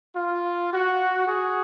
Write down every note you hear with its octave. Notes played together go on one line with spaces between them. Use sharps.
F4
F#4
F#4 G#4